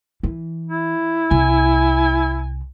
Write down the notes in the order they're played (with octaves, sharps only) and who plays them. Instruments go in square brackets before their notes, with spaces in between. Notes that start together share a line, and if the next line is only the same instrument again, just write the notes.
[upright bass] E3
[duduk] E4
[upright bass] C2 [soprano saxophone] G#5